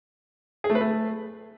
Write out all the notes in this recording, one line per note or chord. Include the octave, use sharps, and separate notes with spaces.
G#4
A3
B4
A3